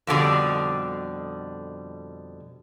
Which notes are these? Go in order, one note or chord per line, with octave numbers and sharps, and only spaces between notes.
F2 B2 D3 G3